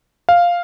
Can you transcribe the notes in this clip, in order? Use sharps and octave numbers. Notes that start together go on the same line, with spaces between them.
F5